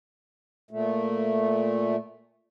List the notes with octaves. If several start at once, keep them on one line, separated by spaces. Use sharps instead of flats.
A#2 A3